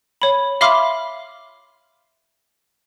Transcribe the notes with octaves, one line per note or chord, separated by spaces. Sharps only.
C#5 B5
E5 F5 B5 C6 D6 F6